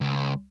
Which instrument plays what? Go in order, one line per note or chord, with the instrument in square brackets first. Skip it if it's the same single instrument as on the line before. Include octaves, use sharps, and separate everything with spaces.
[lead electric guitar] C#2